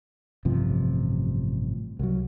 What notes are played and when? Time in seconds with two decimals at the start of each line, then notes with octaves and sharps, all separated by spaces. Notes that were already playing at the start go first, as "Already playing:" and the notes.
0.45 A1 G2 C3 F3
1.99 C2 F#3